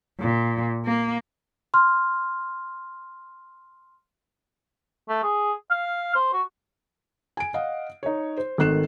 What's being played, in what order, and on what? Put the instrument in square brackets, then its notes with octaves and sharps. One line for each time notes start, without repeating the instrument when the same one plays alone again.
[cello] A#2
A#3
[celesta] C6 F6
[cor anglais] A3
G#4
F5
C5
F#4
[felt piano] G#5 D7
D#5 F5 F#5
D#4 C#5
C5
G#1 D#3 A3 F#6 C7 E7